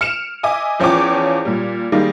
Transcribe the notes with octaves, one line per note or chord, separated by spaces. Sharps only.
F6 C#7 D7 E7 F7
D#5 E5 G#5 D6
E2 F3 C#4 C#5 G5 D6
A#2 G3
D#3 G3 G#3 A#3 D#4